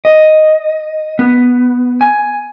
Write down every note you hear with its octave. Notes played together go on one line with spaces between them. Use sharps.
D#5
B3
G#5